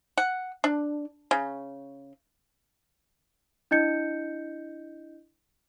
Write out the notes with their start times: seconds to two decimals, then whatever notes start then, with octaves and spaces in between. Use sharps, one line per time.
0.17 F#5
0.64 D4
1.31 C#3
3.71 D4 E4 D#5 G6 C#7